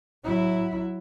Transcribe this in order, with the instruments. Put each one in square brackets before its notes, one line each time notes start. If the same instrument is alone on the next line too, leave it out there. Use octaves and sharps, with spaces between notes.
[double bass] F#3 E4